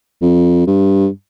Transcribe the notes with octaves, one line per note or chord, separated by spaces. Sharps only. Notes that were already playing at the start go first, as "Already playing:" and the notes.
F2
G2